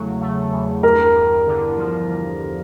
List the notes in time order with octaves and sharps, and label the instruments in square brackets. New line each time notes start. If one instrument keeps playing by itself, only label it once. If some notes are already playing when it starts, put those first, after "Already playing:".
Already playing: [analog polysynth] E2 C#3 F#3 A3
A3
E2
[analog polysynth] G2 [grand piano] A#4
[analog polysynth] G2
D3
F3
G2